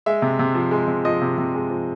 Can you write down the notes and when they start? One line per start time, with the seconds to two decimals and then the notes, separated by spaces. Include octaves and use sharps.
0.06 G#3 E5
0.22 C3
0.39 C3
0.55 F3
0.71 G#3
0.88 C3
1.05 F3 D#5
1.22 C3
1.38 C3
1.54 G#3
1.70 F3